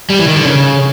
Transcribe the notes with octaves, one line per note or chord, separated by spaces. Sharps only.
G3
E3
D#3
D3
C#3